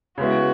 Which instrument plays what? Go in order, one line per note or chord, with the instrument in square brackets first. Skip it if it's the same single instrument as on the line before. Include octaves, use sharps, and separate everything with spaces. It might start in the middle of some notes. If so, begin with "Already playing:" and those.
[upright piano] C#3 G#3 B3 E4 [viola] F#4